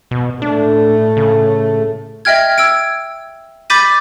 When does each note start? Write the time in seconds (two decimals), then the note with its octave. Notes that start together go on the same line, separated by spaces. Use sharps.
0.11 B2
0.42 A2 A3 D4
1.17 C#3
2.25 D#5 E5 G5 F6 G#6
2.58 E6 G#6 D7
3.70 B5 D6 G6 A6 B6 D#7